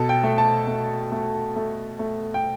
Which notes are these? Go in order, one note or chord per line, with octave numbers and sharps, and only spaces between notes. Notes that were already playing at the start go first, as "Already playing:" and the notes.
Already playing: B2 A4
G5
A3
A5
A3
A3
A3
A3
G5